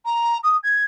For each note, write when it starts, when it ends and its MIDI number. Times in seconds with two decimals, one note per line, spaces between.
0.05 0.38 82
0.43 0.57 87
0.63 0.85 92